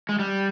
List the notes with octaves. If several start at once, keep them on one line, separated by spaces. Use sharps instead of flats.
G#3
G3